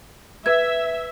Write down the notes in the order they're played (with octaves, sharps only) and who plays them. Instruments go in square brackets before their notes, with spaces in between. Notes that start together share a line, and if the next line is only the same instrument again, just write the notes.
[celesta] B4 G#6 [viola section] E5